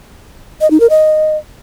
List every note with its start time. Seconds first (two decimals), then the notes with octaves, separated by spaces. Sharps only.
0.61 D#5
0.71 D#4
0.80 A#4
0.90 D#5